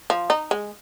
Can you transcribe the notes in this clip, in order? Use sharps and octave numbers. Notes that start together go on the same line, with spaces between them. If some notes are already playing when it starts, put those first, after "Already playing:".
F3
D#4
G#3